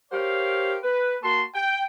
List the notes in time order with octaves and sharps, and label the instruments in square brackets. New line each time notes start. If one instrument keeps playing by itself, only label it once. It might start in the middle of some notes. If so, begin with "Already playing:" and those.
[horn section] G4 A#4 C5 C#5 F5
B4
A#3 F#4 A5 C6
G5